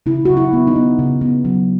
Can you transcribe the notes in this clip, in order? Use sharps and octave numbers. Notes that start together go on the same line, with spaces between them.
C#3 E4
C#3 F#4
E4
B3
D#4
B3
C#3
B3
F#3